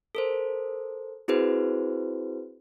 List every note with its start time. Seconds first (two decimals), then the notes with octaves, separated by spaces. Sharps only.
0.15 A4 A#4 C5
1.28 C4 E4 F#4 G#4 B4 C5